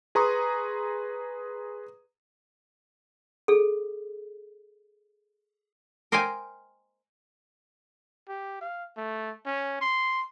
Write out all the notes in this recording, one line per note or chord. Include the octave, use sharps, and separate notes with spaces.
G#4 B4 A#5 C6 C#6 D#6
G#4 A4
A#4 C5 D#5 F5 G5 G#5
G4
F5
A3
C#4
C6